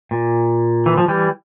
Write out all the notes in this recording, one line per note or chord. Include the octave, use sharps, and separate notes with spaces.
A#2
E3
F3
E3 G3